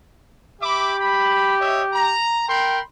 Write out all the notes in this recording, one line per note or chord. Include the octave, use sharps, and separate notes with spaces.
G4 E5 B5 D6
B5
C#5 D#5 E5
A#5
A#4 G5 B5 C6